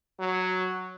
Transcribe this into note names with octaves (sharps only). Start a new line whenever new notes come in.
F#3